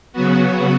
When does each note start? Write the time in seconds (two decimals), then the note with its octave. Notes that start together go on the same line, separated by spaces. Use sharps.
0.13 C#3 F#3 B3 F#4